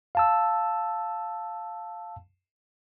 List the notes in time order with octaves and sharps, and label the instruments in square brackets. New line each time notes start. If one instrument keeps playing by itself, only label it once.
[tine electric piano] F5 A5 E6